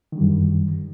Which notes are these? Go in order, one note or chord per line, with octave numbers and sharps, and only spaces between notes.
F#2 D3 D#3 G3